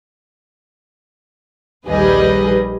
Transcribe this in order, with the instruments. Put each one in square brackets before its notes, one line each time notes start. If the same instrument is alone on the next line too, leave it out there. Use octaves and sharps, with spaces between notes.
[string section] A#1 D#2 G3 G#4 B4 D#5